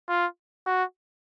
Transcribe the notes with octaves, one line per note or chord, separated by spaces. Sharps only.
F4
F#4